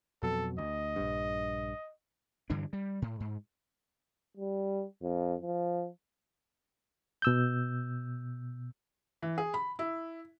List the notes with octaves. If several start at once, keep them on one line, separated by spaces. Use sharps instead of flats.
F2 B2 F#3 A4
D2 D#5
A#1 G2
G2 D3 E3 D4
G3
A2
G#2
G3
F2
F3
B2 E6 G6
E3
G#4
B5
E4